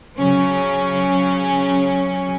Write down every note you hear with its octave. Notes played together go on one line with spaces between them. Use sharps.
C#3 F#3 C#4